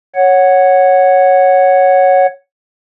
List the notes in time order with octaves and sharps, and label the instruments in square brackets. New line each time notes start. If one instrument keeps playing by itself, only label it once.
[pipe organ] C#5 F#5